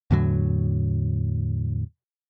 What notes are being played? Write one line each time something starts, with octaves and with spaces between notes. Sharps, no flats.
E2 A2 D3 F#3